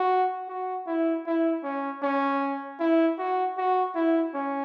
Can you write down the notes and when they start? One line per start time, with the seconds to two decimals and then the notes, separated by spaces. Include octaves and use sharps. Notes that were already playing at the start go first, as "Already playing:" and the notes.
Already playing: F#4
0.49 F#4
0.87 E4
1.26 E4
1.64 C#4
2.02 C#4
2.80 E4
3.18 F#4
3.58 F#4
3.95 E4
4.34 C#4